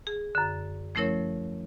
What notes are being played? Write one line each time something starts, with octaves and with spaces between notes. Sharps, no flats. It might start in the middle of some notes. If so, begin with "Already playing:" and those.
G#4
F#2 D3
F3 A3 C#4 E4 A#4 C#5